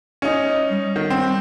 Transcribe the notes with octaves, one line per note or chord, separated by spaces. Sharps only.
C#4 D#4
G3
D#3
C4